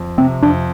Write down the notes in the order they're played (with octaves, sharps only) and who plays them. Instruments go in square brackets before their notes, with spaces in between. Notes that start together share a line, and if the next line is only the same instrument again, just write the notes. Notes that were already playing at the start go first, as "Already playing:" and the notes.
Already playing: [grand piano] F2
[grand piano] C3 [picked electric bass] C4
[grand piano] F2 [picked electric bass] D4